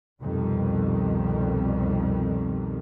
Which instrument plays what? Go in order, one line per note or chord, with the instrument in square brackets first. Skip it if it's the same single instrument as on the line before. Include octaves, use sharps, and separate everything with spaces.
[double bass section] C2 F2 B2 D#3 G3